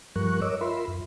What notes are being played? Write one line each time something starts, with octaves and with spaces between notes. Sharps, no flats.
G2 F3 G3 A#4 C#6 F#6
A#4 C#5 D#5 D6 E6
F4 A#4 E5 B5 C6
F#2